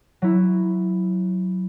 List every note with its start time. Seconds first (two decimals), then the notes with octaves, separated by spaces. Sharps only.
0.22 F#3 E4